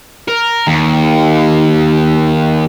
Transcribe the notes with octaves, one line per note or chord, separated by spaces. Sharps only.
A#4
D#2